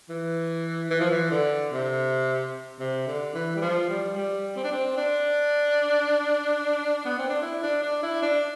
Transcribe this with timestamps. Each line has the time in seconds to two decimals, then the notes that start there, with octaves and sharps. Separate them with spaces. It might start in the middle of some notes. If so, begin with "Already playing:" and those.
0.10 E3
0.90 E3
1.00 F3
1.11 E3
1.31 D3
1.72 C3
2.80 C3
3.07 D3
3.34 E3
3.56 G3
3.62 F3
3.89 G3
4.16 G3
4.56 C4
4.64 D4
4.72 C4
4.97 D4
7.05 B3
7.18 C4
7.30 D4
7.42 E4
7.63 D4
7.82 D4
8.03 E4
8.23 D4